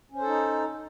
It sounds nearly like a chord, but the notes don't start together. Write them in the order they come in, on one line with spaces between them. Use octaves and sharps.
C#4 C5 A4 D#4